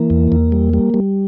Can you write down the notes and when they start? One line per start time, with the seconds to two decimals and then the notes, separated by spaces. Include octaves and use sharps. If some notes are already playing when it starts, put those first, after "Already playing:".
Already playing: E3 A#3
0.10 E2
0.32 E2
0.52 G3
0.74 G3
0.94 G3